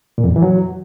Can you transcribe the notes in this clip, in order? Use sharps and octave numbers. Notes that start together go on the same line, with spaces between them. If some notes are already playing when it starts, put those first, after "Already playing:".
A#2
F2
F#2
E3
F#3